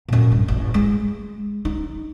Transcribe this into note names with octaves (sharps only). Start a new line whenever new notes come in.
F#2 A#2
G2
A1
G#3
D#4